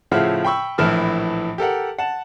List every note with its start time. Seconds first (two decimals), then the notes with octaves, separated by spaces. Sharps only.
0.11 A2 C#3 F3 E5 F#5 F6
0.44 G5 B5 C#6 E6
0.78 A#1 A2 E3 A5 F6
1.58 G4 A4 A#4 F#5
1.98 F#5 A5